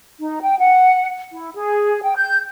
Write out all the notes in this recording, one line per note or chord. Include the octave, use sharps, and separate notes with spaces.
D#4
G5
F#5
E4
G#4
G5
G6